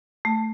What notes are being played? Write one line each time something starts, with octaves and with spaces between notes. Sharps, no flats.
A3